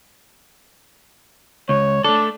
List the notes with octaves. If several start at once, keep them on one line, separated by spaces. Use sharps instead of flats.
C#2 C#5
A3 D4 A4